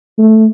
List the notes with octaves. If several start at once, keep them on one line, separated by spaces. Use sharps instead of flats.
A3